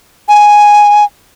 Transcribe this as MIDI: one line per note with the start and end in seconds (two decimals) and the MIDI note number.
0.29 1.04 80